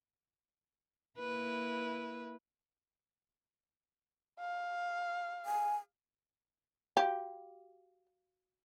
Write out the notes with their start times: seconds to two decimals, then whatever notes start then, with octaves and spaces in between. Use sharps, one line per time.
1.18 A#3 E4 B4
4.40 F5
5.46 G#5
6.97 F#4 G4 F5 D6